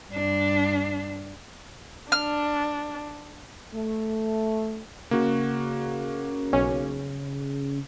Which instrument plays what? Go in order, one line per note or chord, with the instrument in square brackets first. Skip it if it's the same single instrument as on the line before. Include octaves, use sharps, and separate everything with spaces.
[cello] G2 D4
[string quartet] D4 [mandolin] F6
[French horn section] A3
[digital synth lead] C#3 [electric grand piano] A#3 F#4
[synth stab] B1 C#4